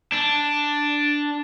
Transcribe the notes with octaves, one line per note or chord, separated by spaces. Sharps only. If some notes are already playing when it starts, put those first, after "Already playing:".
D4